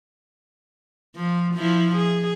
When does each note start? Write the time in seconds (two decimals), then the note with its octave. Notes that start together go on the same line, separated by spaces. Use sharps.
1.16 F3
1.54 F3 E4
1.95 G#4